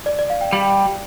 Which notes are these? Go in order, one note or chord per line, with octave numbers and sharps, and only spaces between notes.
D5
D5
F5
G5
G3 G5